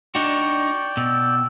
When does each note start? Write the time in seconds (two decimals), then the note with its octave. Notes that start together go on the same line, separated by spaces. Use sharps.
0.15 D4 D#4 F#4 D5 G5 C#6
0.97 B2 E6